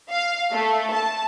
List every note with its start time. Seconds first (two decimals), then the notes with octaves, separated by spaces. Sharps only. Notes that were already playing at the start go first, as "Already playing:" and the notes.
0.11 F5
0.52 A3
0.93 A5